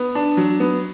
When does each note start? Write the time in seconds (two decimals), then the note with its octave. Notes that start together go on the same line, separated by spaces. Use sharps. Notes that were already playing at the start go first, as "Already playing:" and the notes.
Already playing: B3
0.15 D4
0.37 F#3
0.60 B3